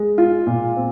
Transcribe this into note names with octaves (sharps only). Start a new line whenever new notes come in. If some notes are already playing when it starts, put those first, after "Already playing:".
Already playing: G#3
F4
A#2
C4